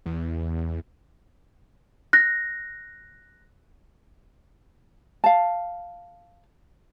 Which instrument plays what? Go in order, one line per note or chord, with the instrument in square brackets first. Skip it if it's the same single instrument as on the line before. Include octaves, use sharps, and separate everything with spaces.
[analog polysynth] E2
[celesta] F#6 A#6
[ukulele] F5 A5